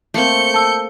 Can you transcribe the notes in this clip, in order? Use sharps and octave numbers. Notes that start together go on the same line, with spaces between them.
A3 A#3 C4 A4 G6 C#7
A5 E6